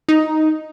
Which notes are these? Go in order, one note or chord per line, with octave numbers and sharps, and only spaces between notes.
D#4